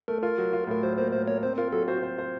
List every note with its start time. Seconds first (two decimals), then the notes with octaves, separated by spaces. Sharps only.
0.08 A3 A#4
0.22 F4 A#4
0.38 F#3
0.53 F4
0.67 A2 A#4
0.83 F#3 C5
0.98 A#3 C5
1.12 A2 C5
1.27 A#3 C#5
1.43 C4 C5
1.58 F4 A#4
1.72 F#3 A4
1.88 F#4 C5
2.03 C5
2.18 C5